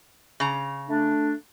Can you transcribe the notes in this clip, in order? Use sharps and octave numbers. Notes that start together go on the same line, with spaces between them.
C#3 A#5
A3 D4